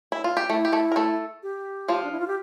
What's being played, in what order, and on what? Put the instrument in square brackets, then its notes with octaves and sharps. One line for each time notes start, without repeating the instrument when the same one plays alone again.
[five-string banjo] E4
F4
G4
[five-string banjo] A3 A4 [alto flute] E4
[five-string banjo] G4
A3 A4
A#4
A3 A4
[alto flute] G4
[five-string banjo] F3 F4
[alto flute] D4
E4
F4
G4